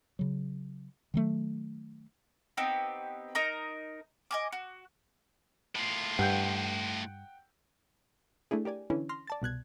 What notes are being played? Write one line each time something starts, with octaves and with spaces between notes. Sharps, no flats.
C#3 F#3
D#3 F#3 A3
B3 C4 D#4 G4
D#4 A#4 A#5
D#5 G#5 D6
F#4
A2 F4
G2 F#5 G5 G6
A3 D4 E4 G#4
G4 A#4 D5 G#5
D3 E3 C#4 E4
C6 F6 A#6
D5 A5 A6
C2 B2 F#6 G#6